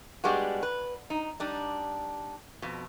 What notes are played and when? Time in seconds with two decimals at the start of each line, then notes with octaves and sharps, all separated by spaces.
0.24 G3 G#3 B3 D4 F#4
0.63 B4
1.10 D#4
1.40 G3 D4 D#4
2.62 F2 B2